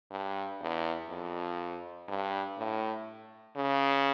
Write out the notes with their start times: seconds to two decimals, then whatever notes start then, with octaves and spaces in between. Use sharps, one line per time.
0.11 G2
0.61 E2
1.10 F2
2.08 G2
2.58 A2
3.56 C#3